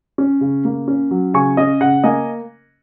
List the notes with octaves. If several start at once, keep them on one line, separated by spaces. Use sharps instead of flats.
C#4
C#3
A#3
C#4
F#3
C#3 G#5 C#6
C#4 D#5
C#3 F#5
A#3 D#5 G#5